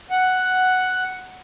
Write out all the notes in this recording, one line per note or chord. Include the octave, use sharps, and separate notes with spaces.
F#5